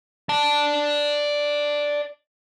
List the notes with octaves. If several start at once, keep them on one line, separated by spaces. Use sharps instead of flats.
D5 A5